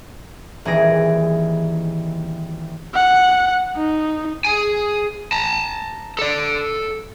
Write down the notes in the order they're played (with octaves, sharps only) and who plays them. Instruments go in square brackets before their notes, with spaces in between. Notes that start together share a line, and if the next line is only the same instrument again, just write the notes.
[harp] D#1 E3 G#4 A#6 D7
[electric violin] F#5
D#4
[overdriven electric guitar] G#4 G#5
A5 A#5
A4 D5